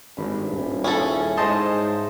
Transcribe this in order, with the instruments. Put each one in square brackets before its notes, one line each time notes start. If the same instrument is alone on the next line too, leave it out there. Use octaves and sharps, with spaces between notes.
[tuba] G#1 [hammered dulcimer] G2 B5
[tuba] D#1
[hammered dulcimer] C#3 E4 [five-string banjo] C#4 G#4 A4
[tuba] G#2 [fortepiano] C5 D#5 A5